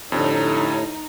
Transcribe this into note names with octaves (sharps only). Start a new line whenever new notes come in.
F2 A2 D3 D#4 G4 A4 C#5